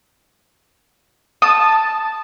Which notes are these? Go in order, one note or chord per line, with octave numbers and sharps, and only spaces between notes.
A5 D#6